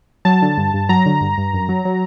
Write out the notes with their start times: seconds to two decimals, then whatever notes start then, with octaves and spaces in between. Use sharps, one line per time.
0.25 F#3 A5
0.42 D3
0.57 G2
0.74 G2
0.89 F#3 A#5
1.06 D3
1.21 G2
1.38 G2
1.53 F#2
1.69 F#3
1.85 F#3